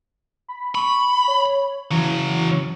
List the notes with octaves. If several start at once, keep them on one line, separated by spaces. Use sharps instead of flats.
B5
B5 C#6
C#5
C#3 E3 F#3